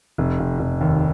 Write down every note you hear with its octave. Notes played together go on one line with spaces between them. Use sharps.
F1
F1
F1
D#2